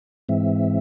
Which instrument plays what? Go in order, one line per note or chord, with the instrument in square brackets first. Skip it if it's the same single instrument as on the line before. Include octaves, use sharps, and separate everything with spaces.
[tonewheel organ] G#2 E3 G#3 C4 E5